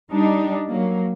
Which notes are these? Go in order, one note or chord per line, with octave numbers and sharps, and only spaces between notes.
G3 D4 D#4
F#3 A#3